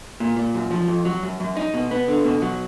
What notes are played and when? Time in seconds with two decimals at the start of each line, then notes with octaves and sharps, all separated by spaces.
0.20 A#2
0.37 A#2
0.54 F#2
0.71 F3
0.88 F2
1.05 F#3
1.23 F#2
1.40 F#2
1.57 D#4
1.74 B2
1.91 B3
2.08 D3
2.24 B2
2.42 F#3